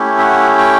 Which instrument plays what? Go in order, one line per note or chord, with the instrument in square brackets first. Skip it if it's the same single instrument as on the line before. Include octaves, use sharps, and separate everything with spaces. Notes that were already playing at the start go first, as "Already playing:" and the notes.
Already playing: [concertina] A3 C#4 E4 G4
E5
F#5
G5